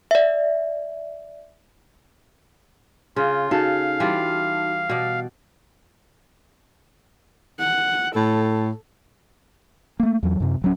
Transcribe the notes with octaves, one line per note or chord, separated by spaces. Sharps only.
D5 E5
C#3 F4
C#3 D#4 F#4 A4 F5 A5
E3 G3 F4
B2 D5
F#5
A2 A4
A3 A#3
E2 F#3
F#2 C3
D1 F#3 C#4